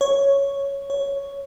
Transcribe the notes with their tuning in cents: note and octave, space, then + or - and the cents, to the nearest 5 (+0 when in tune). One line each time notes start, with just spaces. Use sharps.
C#5 +0
C#5 +5